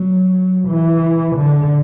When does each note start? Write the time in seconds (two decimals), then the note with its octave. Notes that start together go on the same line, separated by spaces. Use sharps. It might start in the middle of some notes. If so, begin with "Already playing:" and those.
Already playing: F#3
0.68 E3
1.36 D3